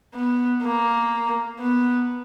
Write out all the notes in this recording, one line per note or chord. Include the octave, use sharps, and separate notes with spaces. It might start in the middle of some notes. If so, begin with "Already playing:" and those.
B3
A#3
B3